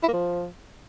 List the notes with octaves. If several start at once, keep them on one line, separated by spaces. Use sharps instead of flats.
E4
A#3
F3